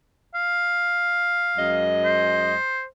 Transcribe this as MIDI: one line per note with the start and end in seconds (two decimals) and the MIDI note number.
0.35 1.89 77
1.57 2.54 42
1.57 2.54 56
1.57 2.54 75
2.04 2.85 72